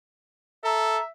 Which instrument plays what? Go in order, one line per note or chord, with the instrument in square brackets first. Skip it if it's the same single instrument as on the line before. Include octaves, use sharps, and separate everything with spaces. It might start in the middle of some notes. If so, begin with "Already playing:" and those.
[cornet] A4 [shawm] E5 [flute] A#5